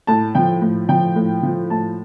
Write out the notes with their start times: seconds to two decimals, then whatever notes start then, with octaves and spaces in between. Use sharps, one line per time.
0.07 A2 A5
0.35 F3 G5
0.61 A2
0.89 F3 G5
1.16 A2
1.43 F3
1.70 A2 A5